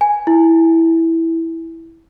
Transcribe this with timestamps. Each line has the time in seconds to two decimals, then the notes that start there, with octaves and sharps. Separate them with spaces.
0.01 G#5
0.27 E4